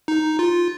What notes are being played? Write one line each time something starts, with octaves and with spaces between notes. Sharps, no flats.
D#4
F4